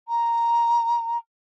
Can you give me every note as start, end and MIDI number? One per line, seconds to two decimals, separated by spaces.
0.08 1.17 82